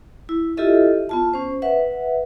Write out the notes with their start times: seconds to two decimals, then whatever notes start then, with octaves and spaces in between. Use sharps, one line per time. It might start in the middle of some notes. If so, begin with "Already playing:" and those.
0.29 E4
0.57 E4 F4 G4 A4 D#5 E5
1.09 B3 F4 A5
1.33 C#4 C5
1.62 B4 E5 F#5